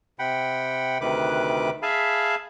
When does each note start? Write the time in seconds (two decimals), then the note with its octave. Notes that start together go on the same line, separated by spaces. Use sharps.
0.19 C3 F#5 G5 B5
1.01 D2 C3 D#3 B4 D6 F#6
1.82 G#4 E5 F5 G#5 A5 B5